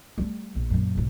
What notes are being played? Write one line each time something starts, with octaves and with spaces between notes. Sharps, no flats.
G3 A3
A#1
F#2 A#2
B1 G#2